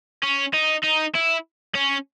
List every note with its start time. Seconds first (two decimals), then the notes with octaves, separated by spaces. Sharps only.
0.23 C#4
0.53 D#4
0.83 D#4
1.15 E4
1.75 C#4